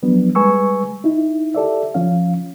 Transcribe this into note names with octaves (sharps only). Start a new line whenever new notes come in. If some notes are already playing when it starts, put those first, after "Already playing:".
F3 F#3 B3 D4
G3 G#3 B4 G#5 C#6 E6
D#4 E4
G4 A4 D5 E5
F3 C#4 F5